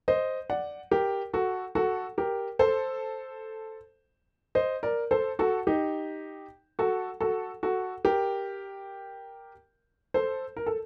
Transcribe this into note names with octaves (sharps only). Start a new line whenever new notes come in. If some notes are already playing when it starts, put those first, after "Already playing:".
C5 D#5
D5 F#5
G4 A#4
F#4 A4
F#4 A4
G4 A#4
A4 C5
C5 D#5
A#4 D5
A4 C5
F#4 A4
D#4 G4
F#4 A4
F#4 A4
F#4 A4
G4 A#4
A4 C5
A#4
A4